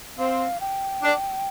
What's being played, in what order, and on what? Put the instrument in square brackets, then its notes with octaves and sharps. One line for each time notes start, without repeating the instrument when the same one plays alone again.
[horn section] C4 [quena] F5
[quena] G5
[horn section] D4